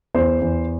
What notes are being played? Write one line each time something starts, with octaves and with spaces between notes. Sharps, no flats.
E2 C5
E2